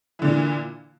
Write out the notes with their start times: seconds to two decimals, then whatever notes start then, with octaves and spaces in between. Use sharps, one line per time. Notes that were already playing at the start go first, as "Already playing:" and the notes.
0.19 E3
0.22 D3
0.25 A#2